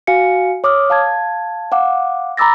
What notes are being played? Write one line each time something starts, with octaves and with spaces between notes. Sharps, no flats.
F#4 F5 G#5 C#7
C#5 D6 D#6 F6
F5 A5 G#6
F5 F#5 D6
A#5 B5 D6 E6 A6 A#6